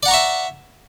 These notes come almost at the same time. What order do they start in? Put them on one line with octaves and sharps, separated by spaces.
D5 F#5 A#5 C#6 E5